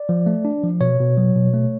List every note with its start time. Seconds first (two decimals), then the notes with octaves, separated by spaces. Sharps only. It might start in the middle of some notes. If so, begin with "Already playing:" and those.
Already playing: D5
0.09 F3
0.26 A3
0.45 D4
0.64 F3
0.81 B2 C#5
1.00 B2
1.17 F#3
1.36 B2
1.54 A3